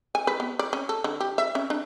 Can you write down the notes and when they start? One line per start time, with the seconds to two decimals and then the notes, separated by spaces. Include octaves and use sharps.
0.15 G#5
0.27 B4
0.40 B3
0.59 D5
0.73 C#4
0.89 A4
1.04 D3
1.20 G4
1.38 E5
1.55 C#4
1.70 D4